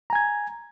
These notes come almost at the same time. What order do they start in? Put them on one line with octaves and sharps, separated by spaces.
A#5 G#5 G#6